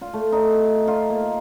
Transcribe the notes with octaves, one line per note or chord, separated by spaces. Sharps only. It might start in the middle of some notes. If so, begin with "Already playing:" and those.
F4
A3
D#4
F4
A#3